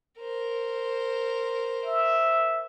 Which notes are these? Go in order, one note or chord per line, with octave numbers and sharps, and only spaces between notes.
A#4 C5
E5